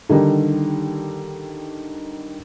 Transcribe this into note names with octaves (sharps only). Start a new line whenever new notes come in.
D3 D#3 G3 D#4